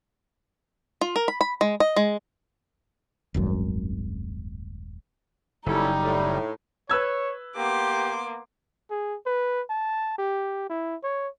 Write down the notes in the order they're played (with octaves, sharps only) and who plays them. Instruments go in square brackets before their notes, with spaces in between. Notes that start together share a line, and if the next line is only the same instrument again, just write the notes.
[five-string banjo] F4
A#4
B5
B5
G#3
D#5
G#3
[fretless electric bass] D#1 G#1 F#2
[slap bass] F#1 [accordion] G3 [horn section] C#4 E4 A4 [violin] D#4
[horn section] A2
[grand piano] B4 E6 G#6 [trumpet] C#5
[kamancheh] A#3 B3 [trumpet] G4 [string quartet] C6 D6
[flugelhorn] G#4
B4
A5
G4
E4
C#5